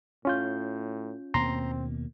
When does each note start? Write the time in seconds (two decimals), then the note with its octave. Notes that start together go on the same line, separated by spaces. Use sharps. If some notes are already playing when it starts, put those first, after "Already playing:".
0.25 A2 C#4 F4 G6
1.34 D#2 B2 A#3 C4 A#5 C6